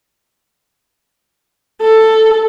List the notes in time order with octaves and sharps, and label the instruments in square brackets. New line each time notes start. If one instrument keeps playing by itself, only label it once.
[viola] A4